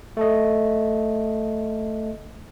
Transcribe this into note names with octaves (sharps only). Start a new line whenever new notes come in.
A3 A4 D#5